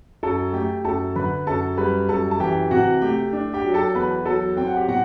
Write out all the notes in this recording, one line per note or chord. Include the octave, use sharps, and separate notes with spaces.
F#2 A4 A5
A3 G4 G5
F#2 A4 A5
D3 B4 B5
F#2 A4 A5
G3 B4 B5
F#2 A4 A5
A5
E3 G4 G5
C3 F#4 F#5
A3 G4 G5
D4
G4 G5
F#3
A4 A5
E2 B4 B5
F#3 A4 A5
C4 G5
F#5
G4 G5
B2 F#4 F#5